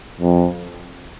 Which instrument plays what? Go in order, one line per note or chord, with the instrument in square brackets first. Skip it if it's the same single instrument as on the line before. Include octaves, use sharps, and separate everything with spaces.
[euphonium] F2